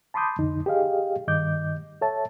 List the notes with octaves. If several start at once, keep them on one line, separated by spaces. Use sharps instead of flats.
A5 B5 C6 D6 D#6 G6
C2 F2 D3 D#4
G4 G#4 D#5 F5
G2 D#3 D#5 D6 G6
A4 C#5 E5 A5